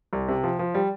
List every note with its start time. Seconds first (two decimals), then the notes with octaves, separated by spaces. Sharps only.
0.13 C2
0.28 C3
0.44 F3
0.59 F3
0.74 G3